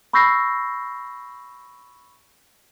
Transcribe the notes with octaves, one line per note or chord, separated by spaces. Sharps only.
B5 C#6 E6 G6 A#6 C7